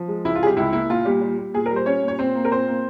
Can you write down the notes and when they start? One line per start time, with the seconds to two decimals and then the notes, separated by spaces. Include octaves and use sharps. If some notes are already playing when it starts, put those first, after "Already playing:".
Already playing: F3
0.08 G#3
0.24 C#2 E4
0.35 F4
0.41 C3 G#4
0.46 G3 G4
0.57 C#2 E4
0.73 A#3 E4
0.89 A#2 F4
1.05 A#2 G3 G4
1.21 G3
1.38 G3
1.54 A#2 G#4
1.66 G3 A#4
1.76 C5
1.86 G3 C#4 C#5
2.03 A#2
2.08 C#5
2.19 A#2 C4 C5
2.35 A#3
2.45 A#4
2.51 A#2 C4 C5
2.68 A#3